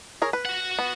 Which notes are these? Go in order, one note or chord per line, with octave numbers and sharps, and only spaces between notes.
G#4 A#4 C#5
B4
F#4 F#5
B3